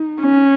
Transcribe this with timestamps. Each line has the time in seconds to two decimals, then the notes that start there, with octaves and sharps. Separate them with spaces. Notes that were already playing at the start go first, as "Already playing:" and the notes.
Already playing: D#4
0.22 C#4